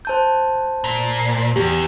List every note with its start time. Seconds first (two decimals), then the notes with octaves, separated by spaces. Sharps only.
0.05 C5 A5 G6
0.84 A#2
1.56 E2 G4